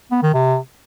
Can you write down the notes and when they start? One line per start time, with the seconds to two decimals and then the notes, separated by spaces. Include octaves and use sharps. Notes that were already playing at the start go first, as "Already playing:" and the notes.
0.11 B3
0.23 D#3
0.34 C3